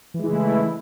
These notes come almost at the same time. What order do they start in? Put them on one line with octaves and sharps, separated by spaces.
E3 G#3 E4 C#3 A3